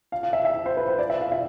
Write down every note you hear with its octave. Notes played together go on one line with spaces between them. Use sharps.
F5
F5
E5
E5
C5
B4
C5
D5
E5
F5
E5